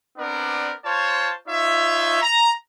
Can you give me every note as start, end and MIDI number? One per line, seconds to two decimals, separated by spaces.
0.18 0.73 59
0.18 0.73 60
0.18 0.73 62
0.18 0.73 70
0.18 0.73 74
0.85 1.33 65
0.85 1.33 72
0.85 1.33 73
0.85 1.33 81
1.48 2.21 63
1.48 2.21 65
1.48 2.21 73
1.48 2.21 76
2.22 2.51 82